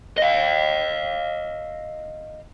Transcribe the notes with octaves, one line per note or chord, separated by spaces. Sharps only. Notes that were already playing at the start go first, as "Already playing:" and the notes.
D#5 F5